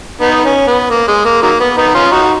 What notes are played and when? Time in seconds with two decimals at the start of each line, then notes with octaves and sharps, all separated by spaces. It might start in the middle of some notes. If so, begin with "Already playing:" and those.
0.21 B3 D#4
0.45 C#4
0.67 B3
0.90 A#3
1.08 G#3
1.25 A#3
1.42 D#3 F#3 A#3
1.60 B3
1.77 B3 D#4
1.94 C#4 F4
2.12 D#4 F#4